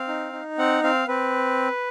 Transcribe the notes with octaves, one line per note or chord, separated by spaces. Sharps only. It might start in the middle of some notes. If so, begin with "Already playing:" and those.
Already playing: C4 F5
D#4
D#4
C4 F#5
C4 F5
C4 B4